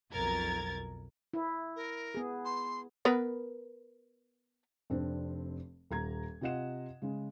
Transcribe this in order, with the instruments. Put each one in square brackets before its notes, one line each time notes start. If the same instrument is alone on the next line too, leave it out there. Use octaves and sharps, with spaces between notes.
[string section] B1 F2 A#4 G#6 A6
[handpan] E4
[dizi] A#4
[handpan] B3 G#4
[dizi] C6
[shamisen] B3 A#4 B4
[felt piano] F1 C4 D4
D#1 A#5 G#6
C3 F4 D#5 F#5 E7
C#3 G#3